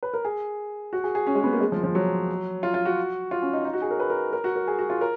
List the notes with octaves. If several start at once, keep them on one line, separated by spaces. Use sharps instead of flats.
B4
A#4
G#4
F#4
G#4
G#4
C#4
G#3
B3
A#3
G#3
F3
F3
F#3
F4
F4
F#4
F4
C#4
D#4
D#4
F#4
G#4
A#4
B4
A#4
A#4
F#4
A#4
G#4
F#4
F4
A#4